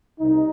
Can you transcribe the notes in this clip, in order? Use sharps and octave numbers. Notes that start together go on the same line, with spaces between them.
C2 C3 D#4